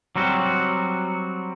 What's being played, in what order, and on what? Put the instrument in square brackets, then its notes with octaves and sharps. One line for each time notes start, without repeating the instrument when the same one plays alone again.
[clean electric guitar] F#3 G3 C4 F#4